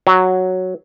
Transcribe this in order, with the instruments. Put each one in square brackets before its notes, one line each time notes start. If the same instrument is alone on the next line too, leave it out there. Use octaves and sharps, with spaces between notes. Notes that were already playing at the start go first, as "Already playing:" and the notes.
[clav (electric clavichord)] F#3